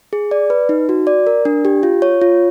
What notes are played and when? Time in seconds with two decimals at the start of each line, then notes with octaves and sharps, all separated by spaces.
0.13 G#4
0.31 D5
0.50 B4
0.69 D#4
0.89 F#4
1.07 D5
1.27 A#4
1.45 D4
1.65 G4
1.83 F4
2.02 C#5
2.21 F4